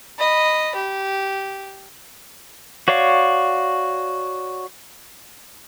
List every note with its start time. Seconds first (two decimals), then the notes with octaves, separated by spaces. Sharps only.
0.19 D#5 B5
0.75 G4
2.88 F#4 C#5 D5 F5 C#6